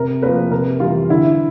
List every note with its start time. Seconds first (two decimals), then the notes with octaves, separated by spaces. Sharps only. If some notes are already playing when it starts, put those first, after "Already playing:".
Already playing: C3 A#4
0.22 F3 A#3 B4
0.51 C3 A#4
0.80 E3 G3 F4
1.10 D3 E4